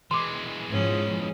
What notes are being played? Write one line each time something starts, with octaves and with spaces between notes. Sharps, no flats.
E3 G#3 C6 D6
G#2 F3 C#4 G#4